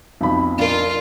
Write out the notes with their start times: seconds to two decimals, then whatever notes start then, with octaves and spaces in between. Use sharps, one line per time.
0.21 B1 F2 B5
0.59 D4 F4 A#4